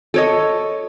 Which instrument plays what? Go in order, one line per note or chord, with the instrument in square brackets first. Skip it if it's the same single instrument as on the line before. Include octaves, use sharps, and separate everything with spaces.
[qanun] A4 C#5 D#5